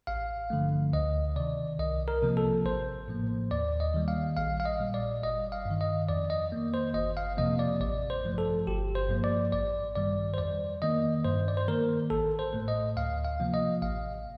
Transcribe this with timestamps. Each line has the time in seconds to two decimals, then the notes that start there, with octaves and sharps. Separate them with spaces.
0.07 A1 F5
0.50 G2 D3 F3 A3
0.93 D2 D#5
1.36 C3 D#3 D5
1.79 C2 D#5
2.08 A#4
2.22 C3 F3 A#3
2.37 A4
2.65 A1 C5
3.08 A2 F3 A#3
3.51 D#2 D5
3.80 D#5
3.94 D#3 G3 A#3
4.08 F5
4.37 A#1 F5
4.60 F5
4.66 D#5
4.80 A#2 G3
4.94 D5
5.22 G1 D#5
5.52 F5
5.66 G2 D#3
5.81 D#5
6.09 F2 D5
6.30 D#5
6.52 D#3 A#3
6.74 C5
6.94 G1 D#5
7.17 F5
7.37 F2 C3 F3 A#3 D#5
7.59 D5
7.80 A1 D5
8.10 C5
8.24 G2 F3 A3
8.38 A4
8.67 G1 G4
8.95 C5
9.09 G2 F3 A#3
9.24 D5
9.52 A1 D5
9.96 G2 D#3 G3 D5
10.34 C5
10.38 F2 D5
10.82 D#3 A#3 D#5
11.24 G2 C5
11.48 D5
11.57 C5
11.68 D#3 A#3 A#4
12.10 A1 A4
12.39 C5
12.53 A2 A3
12.68 D#5
12.97 D2 F5
13.25 F5
13.40 C3 F3 A#3
13.54 D#5
13.82 A1 F5